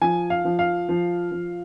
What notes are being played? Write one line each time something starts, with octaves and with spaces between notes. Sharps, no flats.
F3 G#5
F5
F3
F5
F3
F3